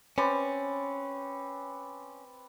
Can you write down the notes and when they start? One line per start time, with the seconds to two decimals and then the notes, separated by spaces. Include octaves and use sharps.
0.18 C4 C#4 B4 D5